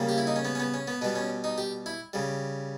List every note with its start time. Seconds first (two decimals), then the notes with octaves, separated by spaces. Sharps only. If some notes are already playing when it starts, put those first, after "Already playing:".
Already playing: C#3 G3 A#3
0.09 G4
0.18 E4
0.27 D#4
0.36 C#4
0.45 B3
0.55 C#4
0.60 B3
0.74 C#4
0.88 B3
1.01 B2 G3 B3
1.15 C#4
1.44 D#4
1.58 G4
1.86 E4
2.13 C#3 G3